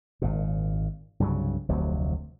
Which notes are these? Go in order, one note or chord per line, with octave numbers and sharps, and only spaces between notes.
G#1 A#2
C2 G2 C#3 F#3
F1 D2 C3 F#3